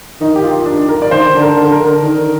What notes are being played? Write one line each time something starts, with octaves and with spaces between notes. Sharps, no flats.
D#3 D#4
G4
F4
D4
A#4
D5
D#3 C5
D3
A#4
D3
A#4
D3
D#3